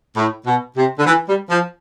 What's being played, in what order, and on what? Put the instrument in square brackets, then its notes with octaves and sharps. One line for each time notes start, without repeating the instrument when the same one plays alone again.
[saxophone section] A2
B2
C3
D3
E3
G3
F3